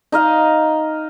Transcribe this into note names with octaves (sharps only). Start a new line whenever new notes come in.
D#4 D#5 F5